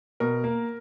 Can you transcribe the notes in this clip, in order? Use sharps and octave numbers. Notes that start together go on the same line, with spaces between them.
B2 A#4
A#3